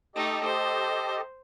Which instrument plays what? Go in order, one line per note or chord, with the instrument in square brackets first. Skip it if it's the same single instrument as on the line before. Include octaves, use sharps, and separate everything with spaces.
[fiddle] A3 D#4 [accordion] G4 A4 D#5
[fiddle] C5